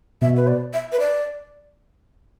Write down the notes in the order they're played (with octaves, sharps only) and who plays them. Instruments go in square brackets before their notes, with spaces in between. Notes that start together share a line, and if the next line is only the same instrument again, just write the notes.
[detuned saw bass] B2 [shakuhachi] E5
[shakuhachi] B4
D5
E5
B4
D5